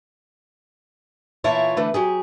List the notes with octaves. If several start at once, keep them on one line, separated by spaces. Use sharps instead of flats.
A#2 E3 E4 F4 C#5 A5
D3 E3 A3 B4
F#3 G4 G#4